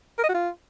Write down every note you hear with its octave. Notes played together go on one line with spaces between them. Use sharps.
A#4
D#5
F#4
F4